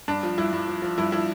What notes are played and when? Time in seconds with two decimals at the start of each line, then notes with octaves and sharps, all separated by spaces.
0.08 G2 D4
0.23 F3
0.38 G2 E4
0.52 G2
0.67 F3
0.82 F3
0.98 G2 E4
1.12 F3 E4